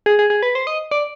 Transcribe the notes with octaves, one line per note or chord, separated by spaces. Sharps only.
G#4
G#4
G#4
B4
C5
D#5
D5